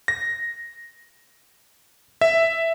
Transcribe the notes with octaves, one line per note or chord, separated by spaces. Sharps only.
A#6
E5